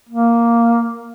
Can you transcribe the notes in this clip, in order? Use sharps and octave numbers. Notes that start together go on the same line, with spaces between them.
A#3